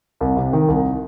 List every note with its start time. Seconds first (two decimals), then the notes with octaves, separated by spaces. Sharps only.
0.21 C2
0.37 C3
0.53 D#3
0.68 C2